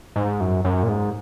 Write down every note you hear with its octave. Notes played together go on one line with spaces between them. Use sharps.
G#2
F#2
F#2
A#2
G#2